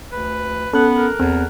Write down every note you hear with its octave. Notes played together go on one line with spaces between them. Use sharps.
D2 B4
B3 C#4 A4 F#6
A#4
E2 C4